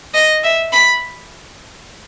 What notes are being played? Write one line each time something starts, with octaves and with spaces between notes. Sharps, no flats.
D#5
E5
B5